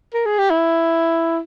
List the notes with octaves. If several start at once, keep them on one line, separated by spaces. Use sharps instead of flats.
A#4
G#4
G4
E4